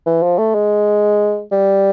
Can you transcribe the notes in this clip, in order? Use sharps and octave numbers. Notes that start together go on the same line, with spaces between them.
E3
F3
A3
G#3
G3